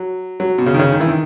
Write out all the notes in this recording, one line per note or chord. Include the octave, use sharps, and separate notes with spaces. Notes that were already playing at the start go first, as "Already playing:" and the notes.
Already playing: F#3
F#3
B2
C#3
D#3
C#3
D#3
E3
D#3